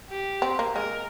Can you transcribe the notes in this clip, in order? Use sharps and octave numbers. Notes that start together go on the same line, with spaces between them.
G4
C4
A#3
G#3 A#4